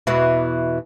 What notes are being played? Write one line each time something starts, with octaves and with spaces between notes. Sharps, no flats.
E2 B2 E3